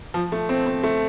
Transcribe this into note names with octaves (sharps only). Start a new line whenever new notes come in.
F3
A3
C4
C4
A3